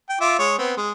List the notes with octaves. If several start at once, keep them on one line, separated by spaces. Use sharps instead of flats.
G5
F4 E5 D6
G#3 C#5
B3 C4
G#3